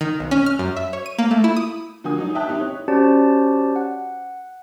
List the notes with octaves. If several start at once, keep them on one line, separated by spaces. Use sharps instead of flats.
D#3
B1
C#4
F6
F#2
E5
C#5
D#7
A#3
A3
E4
D#6
D3 F3 A#3 F#4 G#5 D#6
F#3 D#4
E5 G5 A5 D#6 F#6
C4 D#4 E4 G4
C#5
C#4 F#4 G4 C5 D5 A5
F#5